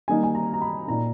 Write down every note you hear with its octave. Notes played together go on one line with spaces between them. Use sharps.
D#3 G3 A#3 D#4 G#5
G#5
A#5
A#5
B5
A#2 A#3 D#4 A#5